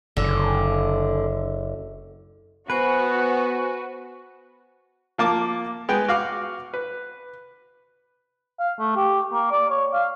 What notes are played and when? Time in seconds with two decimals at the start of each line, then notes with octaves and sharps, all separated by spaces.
0.17 F#1 D3
2.70 B3 F#4 B4 C5 G#5
5.18 F3 A#3 A5 D6
5.89 G#3 B3 G5
6.08 F#4 F5 D6
6.74 B4
8.60 F5
8.79 A3
8.96 G4
9.33 A#3
9.51 D5
9.70 C#5
9.94 F5